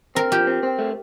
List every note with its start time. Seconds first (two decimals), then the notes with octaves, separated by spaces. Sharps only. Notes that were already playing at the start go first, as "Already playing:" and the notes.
0.15 C4 A#4
0.32 F3 G4
0.47 C4
0.63 C4
0.79 A3